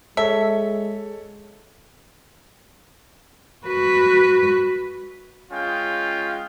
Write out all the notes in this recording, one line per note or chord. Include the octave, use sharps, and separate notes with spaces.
G#3 A4 C#5 E5 A5
F#4 B4
G#3 C#4 F4 G5